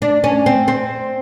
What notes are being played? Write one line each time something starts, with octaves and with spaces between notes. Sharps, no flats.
D4
C#4
C4
C4